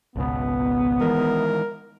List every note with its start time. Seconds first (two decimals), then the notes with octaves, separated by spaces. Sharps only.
0.16 G#1 C#2 B2 B3
1.01 D#3 E3 G#3 A#4